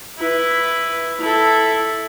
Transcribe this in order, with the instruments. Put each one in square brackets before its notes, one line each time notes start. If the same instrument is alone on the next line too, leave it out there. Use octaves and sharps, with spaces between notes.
[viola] E4 B4
E4 A4